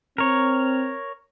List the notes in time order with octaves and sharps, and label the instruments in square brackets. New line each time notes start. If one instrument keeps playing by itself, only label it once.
[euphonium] C4 [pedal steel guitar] A#4 C#5